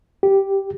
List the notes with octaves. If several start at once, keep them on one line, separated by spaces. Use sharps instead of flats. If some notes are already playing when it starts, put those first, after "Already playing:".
G4